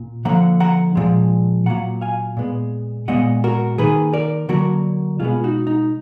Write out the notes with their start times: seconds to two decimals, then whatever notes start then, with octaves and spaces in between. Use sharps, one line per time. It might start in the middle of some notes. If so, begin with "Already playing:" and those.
Already playing: A#2
0.25 D3 F3 A#3 F#5 A#5
0.60 F#5 A#5
0.95 A#2 F3 G#3
1.66 A#2 F#3 A#3 F#5 A#5
2.01 F5 G#5
2.37 A#2 G#3 B3
3.08 A#2 G#3 B3 D#5 F#5
3.44 F#4 A#4
3.78 D#3 A#3 G#4 B4
4.13 A#4 D5
4.49 D3 F#3 A#3 F#4 A#4
5.20 B2 G#3 B3 F4 G#4
5.44 D#4 F#4
5.67 D#4